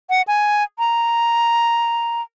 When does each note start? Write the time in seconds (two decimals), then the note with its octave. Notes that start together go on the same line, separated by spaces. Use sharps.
0.10 F#5
0.28 G#5
0.79 A#5